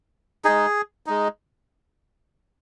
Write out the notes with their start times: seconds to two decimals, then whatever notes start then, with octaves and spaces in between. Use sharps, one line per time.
0.45 G#3 D#4 G#4
1.06 G#3 D#4